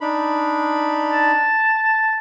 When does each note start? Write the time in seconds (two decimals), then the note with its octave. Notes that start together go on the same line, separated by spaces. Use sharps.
0.01 D4 D#4 B5
1.10 A5